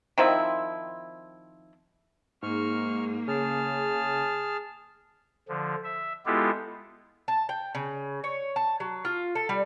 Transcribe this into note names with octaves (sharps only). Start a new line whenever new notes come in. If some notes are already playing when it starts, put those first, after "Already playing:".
D#3 F3 C4 E4
G#2 A#3 C#6 F6
C#3 G#4 A5 F6
D3 F3
E5
G#3 B3 E4 F4 G4 A4
A5
G5
C#3
C#5
A5
F#3
F4
A4
G3